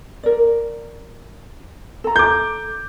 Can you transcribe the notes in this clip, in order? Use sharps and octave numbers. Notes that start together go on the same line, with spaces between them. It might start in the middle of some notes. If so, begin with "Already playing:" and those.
A#4 D5
A4 A#5
D6 G6